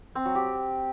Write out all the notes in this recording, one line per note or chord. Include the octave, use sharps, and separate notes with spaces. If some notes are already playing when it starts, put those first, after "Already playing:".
C4
F#3
G4